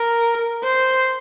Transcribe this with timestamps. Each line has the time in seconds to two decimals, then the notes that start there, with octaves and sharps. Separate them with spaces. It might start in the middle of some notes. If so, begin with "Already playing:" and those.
Already playing: A#4
0.64 C5